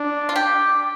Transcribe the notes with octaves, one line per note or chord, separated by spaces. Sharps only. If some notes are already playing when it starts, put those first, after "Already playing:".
Already playing: D4
F4
G4